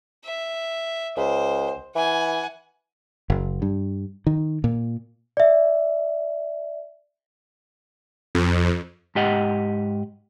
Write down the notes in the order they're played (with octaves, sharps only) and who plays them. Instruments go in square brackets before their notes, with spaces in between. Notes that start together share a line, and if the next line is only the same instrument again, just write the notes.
[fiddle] E5
[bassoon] C#2 [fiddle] C5
[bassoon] E3 [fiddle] F#5 G#5
[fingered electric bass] F#1
G2
D#3
A#2
[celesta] D5 E5
[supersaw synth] F2
[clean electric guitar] G#2 G4 D#5 F#5